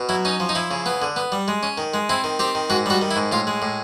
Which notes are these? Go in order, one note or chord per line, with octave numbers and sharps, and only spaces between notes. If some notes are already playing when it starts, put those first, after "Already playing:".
Already playing: B2
F#3 E4
C#4 D#4
F3
D#4
F3 E4
C#3
B3
D3
B3
G3
G#3
C#4
D#3
G#3
C4 E4
D#3
C4 G4
D#3
G#2 F#4
G3 F#4
D#3
E4
G#2
A2 F4
G#3
A2